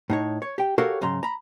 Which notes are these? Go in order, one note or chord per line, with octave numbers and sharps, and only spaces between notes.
A2 D#4 C#5
C#5
G4 G5
F#4 G4 A4 A#4 C#5 F5
G#2 C#3 F#3 A#5 C6
A#5 B5